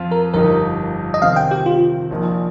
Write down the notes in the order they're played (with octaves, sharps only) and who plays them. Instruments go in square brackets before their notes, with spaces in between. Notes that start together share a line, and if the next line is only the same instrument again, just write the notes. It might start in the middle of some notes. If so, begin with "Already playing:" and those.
Already playing: [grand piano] F2 F3 C4 F4
[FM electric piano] A#4
[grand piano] G1 F2 F3 D#4 G4 [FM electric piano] A#4
[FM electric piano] D#5
[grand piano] C3 D#3 C4 [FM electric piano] F5
[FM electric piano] G5
G4
F4
[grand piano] A#1 A#2 F3 D#4 A#4